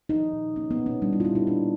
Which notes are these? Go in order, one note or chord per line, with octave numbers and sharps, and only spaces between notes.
F3 D#4
A#2
A#3 C#4
B3
A#2
C#4
G3 D4
E4
F4
A#2 E4
D#4
A#3 D4